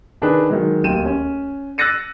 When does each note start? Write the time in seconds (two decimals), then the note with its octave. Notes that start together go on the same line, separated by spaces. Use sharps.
0.22 D#3 D4 D#4 G#4 B4
0.50 D#3 F#3 G#3
0.84 D1 D#2 G5 D#7 E7
1.05 C#4
1.78 E6 F#6 A6 A#6 C#7 D#7